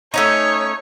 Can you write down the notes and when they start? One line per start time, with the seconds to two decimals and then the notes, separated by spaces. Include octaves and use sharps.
0.14 A3 C#4 D#4 C#5